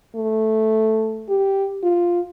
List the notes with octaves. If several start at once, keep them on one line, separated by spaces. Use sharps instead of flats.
A3
G4
F4